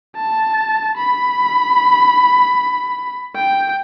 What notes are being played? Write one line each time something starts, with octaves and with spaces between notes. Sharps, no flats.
A5
B5
G5